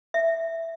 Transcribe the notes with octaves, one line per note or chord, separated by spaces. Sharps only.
E5